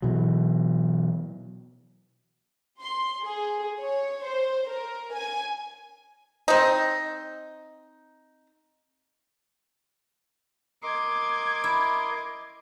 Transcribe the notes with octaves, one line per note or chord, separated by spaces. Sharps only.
B2 E3 F#3
C6
G#4
C#5
C5
A#4
G#5
C4 D#4
A#4 D#5 C6 D6 G#6
E4